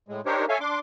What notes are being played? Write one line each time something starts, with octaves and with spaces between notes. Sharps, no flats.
A2 G#3
D4 D#4 G4 A#4 C5 C#5
A4 C#5 E5 F5 G#5
D4 C6 D6